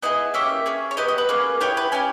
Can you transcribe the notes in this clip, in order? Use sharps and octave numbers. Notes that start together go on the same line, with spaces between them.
B3 E4 G#4 D#5
A#3 C#4 G4 E5
C#4 G#4
C#5
B3 G4 D#5
D#5
B4
A#3 C#4 G#4
B3 E4 G4 C#5
B4
C#4 G4 G#5